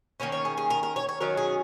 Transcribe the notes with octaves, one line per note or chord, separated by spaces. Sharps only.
D#3 A#3 C#4 C#5
C#5
G#4
G#4
A#4
A#4
C#5
C#5
D#3 F#3 C#4 A#4
G#4